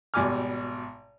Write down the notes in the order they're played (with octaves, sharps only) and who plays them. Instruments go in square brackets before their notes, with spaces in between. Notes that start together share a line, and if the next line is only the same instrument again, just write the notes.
[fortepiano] G#1 B2 G3 G#5 D6 F6